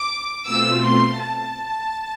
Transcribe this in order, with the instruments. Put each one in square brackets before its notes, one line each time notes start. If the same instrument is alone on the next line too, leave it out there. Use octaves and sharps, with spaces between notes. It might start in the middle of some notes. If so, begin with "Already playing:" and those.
Already playing: [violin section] D6
[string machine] B2 A3 C4 F4 [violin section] E6
[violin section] C6
A5